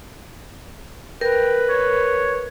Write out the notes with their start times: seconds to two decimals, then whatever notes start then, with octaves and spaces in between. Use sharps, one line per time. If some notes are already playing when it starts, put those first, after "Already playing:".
1.21 A#4 B4 G5
1.69 C#5